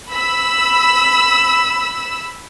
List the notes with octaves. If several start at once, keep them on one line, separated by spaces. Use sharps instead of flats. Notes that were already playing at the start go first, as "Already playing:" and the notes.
B5 E6